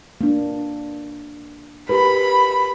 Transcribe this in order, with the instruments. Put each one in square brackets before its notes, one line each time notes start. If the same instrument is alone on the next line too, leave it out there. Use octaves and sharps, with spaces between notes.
[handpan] A#3 D4
[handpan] G4 A#4 B4 [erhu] B5